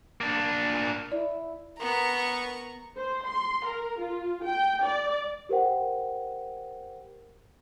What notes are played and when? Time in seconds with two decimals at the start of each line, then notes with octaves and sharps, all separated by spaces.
0.21 A#3 D4
1.12 E4 D5
1.79 B3 A#4 A#5 C#6
2.97 C5
3.26 C6
3.66 A#4
4.00 F4
4.44 G5
4.83 D5
5.49 G4 A#4 C5 F#5 G5